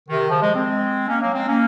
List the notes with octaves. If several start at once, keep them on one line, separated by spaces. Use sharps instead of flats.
C3 D#3
C#3 F3
F3 G#3
G#3 C4
A#3 C#4
F#3 A#3
G#3 C4
A#3 C#4